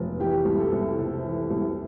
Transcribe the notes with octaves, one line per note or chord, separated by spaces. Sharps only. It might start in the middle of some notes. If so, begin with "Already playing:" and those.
Already playing: F1
E3 G4
C2
A4
C2
C3 A4
E3
C2